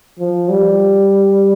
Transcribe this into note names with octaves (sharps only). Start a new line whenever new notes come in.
F3
G3